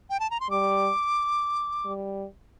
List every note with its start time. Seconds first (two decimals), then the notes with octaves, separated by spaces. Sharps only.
0.10 G5
0.20 A5
0.31 A#5
0.40 C6
0.49 G3 D6
1.85 G3